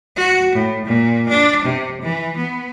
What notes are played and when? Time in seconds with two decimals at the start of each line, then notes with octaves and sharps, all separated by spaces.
0.16 F#4
0.55 A2
0.86 A#2
1.28 D4
1.64 C3
2.01 E3
2.37 B3